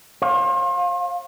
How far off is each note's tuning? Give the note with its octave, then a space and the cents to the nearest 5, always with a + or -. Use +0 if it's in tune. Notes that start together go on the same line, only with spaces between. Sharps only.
C5 +40 F5 +20